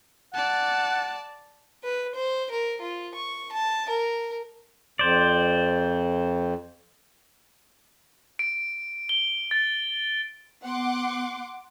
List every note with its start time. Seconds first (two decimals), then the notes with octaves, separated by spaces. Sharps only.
0.34 D5 F#5 A5
1.84 B4
2.15 C5
2.51 A#4
2.81 F4
3.15 C#6
3.52 A5
3.89 A#4
4.99 F2 C5 D5
8.39 D7
9.09 G7
9.51 A6
10.65 B3 F#5 C6 D6